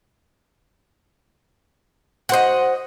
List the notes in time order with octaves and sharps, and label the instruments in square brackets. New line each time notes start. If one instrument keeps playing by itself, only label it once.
[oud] F#4 C5 [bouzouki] D#5 F#5